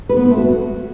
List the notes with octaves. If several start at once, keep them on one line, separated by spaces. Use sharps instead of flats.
B4
B3
C4
A3
F#4